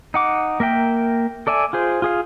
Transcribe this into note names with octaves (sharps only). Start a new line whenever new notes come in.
D#4 F#5 D6
A#3 A#4 E5 G5
A4 D5 E5 G#5
F4 G#4 C5
F4 G#4 F5